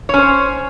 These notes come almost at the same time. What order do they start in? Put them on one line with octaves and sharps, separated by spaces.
C#5 C#4 C5